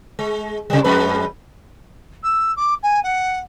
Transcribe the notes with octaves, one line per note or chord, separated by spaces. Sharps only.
G#3
C3 G3
F2 G#3 B4
E6
D6
G#5
F#5